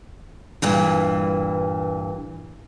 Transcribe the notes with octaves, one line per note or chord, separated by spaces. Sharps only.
G2 A#2 E3